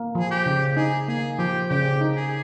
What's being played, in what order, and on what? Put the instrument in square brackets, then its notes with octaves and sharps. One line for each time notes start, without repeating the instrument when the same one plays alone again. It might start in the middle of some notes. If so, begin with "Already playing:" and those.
Already playing: [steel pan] A#3
[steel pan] F3 [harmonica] G#4
[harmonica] G4
[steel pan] C#3
[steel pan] D#4 [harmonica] G#4
[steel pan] A#3 [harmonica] G#4
[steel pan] F3 [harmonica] G4
[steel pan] C#3 [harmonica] G4
[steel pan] D#4
[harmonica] G#4